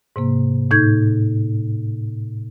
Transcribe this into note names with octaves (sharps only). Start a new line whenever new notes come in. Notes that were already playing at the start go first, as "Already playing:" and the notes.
G#2 C3 A#3
A2 D#4 G6 G#6